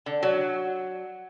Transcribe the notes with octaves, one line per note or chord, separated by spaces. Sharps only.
D3
F#3